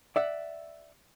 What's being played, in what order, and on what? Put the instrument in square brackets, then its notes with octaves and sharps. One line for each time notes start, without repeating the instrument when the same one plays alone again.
[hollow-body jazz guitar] D5 E5 F#5